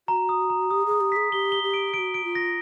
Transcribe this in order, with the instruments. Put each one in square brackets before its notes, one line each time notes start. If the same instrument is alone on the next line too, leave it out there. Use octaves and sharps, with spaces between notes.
[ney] F#4 [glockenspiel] A#5
[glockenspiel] D#6
A#5
[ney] G4 [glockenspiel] D#6
[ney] G#4 [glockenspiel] D#6
[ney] G4
[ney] G#4 [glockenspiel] B6
[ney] G4 [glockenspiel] G7
[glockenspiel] G7
[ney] G4
[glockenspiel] D7
[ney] G4 [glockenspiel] D7
[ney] F#4
[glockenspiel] D7
[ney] F4
[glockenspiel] A#6